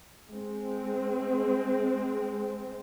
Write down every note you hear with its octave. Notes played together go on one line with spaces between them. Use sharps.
G#3 C4